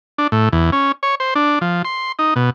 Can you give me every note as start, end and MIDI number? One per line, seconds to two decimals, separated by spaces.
0.18 0.27 62
0.32 0.49 45
0.52 0.71 40
0.72 0.92 61
1.03 1.15 73
1.20 1.34 72
1.35 1.59 62
1.61 1.82 53
1.85 2.12 84
2.19 2.34 63
2.36 2.50 47